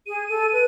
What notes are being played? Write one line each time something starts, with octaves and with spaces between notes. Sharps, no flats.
G#4 D#7
A4
B4